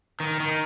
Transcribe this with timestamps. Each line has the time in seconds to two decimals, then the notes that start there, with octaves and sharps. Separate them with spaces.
0.20 D#3
0.40 D#3